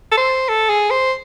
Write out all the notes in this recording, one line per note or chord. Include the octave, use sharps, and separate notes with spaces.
A4
C5
A4
G#4
C5